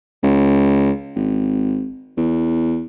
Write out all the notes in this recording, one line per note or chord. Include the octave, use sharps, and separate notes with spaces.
C#2
G#1
E2